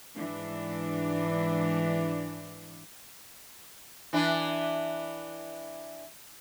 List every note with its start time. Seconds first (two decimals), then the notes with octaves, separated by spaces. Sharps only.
0.15 G#2 E3 D4
4.13 E3 D4 B4